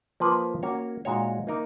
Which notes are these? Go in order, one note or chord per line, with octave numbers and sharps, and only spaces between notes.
F3 A#3 F4 B4
A#3 C#4 F#4 C#5
A#2 G#3 D#4 F#4 C#5
A#3 D#4 A#4